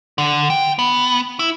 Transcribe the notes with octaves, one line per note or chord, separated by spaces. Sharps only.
D3
G5
B3
E4